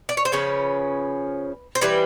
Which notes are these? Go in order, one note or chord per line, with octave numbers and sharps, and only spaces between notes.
D5
C#5
C5
C#3 F3 C#4 B4
C5
E3 G3 C4 B4